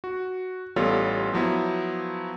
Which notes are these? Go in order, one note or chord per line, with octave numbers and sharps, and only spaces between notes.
F#4
A1 G3 B3 F4 A4 C#5
F3 F#3 B3 E4